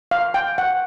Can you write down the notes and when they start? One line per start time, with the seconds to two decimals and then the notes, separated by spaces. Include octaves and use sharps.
0.11 F5
0.34 G5
0.58 F#5